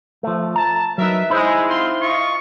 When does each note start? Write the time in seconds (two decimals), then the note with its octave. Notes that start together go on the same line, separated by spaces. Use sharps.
0.23 F3 A3
0.56 A5 A#5
0.98 F#3 D#4 A#4 B4 E5
1.30 G#3 D#4 E4 C5
1.68 C4 F4 C6
2.01 F4 D#5 C#6